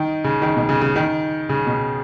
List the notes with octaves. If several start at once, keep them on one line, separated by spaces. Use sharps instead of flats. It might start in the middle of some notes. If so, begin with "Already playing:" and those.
Already playing: D#3
C#3
D#3
B2
C#3
C#3
D#3
C#3
B2